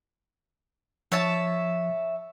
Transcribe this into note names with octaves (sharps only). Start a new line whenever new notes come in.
F3 C#5 E5 A5